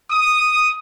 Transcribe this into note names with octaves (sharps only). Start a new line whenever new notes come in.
D#6